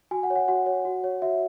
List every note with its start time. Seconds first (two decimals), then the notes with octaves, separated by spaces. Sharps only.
0.11 F#4 G#5
0.23 F#5
0.30 C#5
0.36 F#5
0.48 F#4 F#5
0.66 C#5
0.85 F#4
1.04 C#5
1.22 F#4 E5